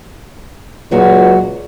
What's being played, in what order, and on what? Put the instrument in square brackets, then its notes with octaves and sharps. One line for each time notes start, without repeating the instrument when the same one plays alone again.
[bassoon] C#2 [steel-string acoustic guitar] A#2 F#3 F#4